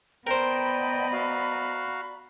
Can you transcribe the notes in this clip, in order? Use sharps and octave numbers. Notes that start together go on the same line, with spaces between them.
B3 A#4 C5 D5 D#5 G5 A#5 B5
F#4 F5